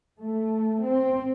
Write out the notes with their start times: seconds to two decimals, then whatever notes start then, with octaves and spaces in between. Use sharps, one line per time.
0.19 A3
0.84 C4